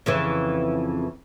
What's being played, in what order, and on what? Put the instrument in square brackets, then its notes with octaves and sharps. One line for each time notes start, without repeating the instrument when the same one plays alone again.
[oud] F2 C#3 E3